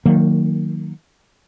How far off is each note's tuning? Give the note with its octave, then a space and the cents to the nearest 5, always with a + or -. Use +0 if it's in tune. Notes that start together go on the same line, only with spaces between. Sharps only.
D#3 +0 F#3 -15 A#3 -30